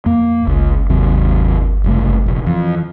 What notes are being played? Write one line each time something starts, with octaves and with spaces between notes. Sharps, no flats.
F2 A#3
G1 C#2
D#2 C3 F#3
F#1 C2 A3
F1 A#1
F2 E3